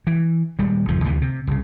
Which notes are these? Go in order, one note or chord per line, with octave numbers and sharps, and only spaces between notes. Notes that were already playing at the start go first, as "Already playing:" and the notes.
E3
D#1 G3 G#3
G#1 F2 C#3 F3
D2 C3 D#3 E3
C3
C2 C#3